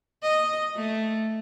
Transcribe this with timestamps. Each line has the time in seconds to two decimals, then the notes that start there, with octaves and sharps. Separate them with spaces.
0.23 D#5
0.75 A3